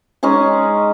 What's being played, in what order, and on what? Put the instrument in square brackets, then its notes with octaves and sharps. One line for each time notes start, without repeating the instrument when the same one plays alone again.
[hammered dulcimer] G#3 C#4 D#4 G#4